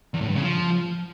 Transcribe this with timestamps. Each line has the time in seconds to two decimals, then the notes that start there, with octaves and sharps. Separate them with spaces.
0.14 E2
0.21 A2
0.28 G2
0.35 C#3
0.42 F3